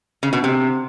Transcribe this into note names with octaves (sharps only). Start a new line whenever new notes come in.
C#3
B2
C3